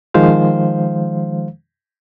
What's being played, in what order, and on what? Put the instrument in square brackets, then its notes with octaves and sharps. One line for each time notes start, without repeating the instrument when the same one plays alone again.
[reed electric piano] D#3 F3 G#3 C5 F5